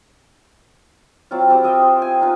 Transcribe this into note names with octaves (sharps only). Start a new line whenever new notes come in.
F#3 C4 E4 F4
C4 E4 G4
F4 D#5 E5 G5
C5
G#5
D#4 F4 B4